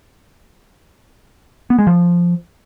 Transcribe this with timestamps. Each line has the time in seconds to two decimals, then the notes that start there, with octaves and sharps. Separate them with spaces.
1.70 B3
1.79 G#3
1.87 F3